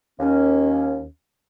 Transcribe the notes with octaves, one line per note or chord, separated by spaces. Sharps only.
D#2 C#4